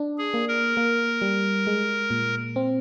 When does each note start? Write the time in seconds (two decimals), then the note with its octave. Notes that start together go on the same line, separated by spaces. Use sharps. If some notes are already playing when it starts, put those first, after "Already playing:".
Already playing: D4
0.18 G#4
0.34 A#3
0.48 A#4
0.77 A#3
1.22 G3
1.67 G#3
2.10 A#2
2.56 C4